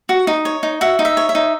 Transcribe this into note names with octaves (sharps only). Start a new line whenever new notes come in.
F#4
D#4
C#5
D#4
F#4 E5
D#4
E5
C#5
E5
D#4